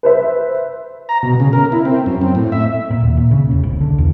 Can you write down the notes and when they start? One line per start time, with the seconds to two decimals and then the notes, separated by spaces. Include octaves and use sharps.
0.03 B4 C5 E5
1.09 A#5
1.23 B2
1.40 C#3
1.53 A#4
1.72 E4
1.85 C4
2.06 F#2
2.21 C4
2.35 A2
2.52 E5
2.91 A#2
3.03 D#2
3.17 A#2
3.31 C#3
3.51 E1
3.63 C2
3.81 D3
3.98 E2